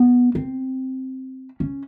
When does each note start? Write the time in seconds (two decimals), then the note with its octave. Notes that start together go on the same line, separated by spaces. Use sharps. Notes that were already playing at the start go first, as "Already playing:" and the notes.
Already playing: B3
0.35 C4
1.60 C#4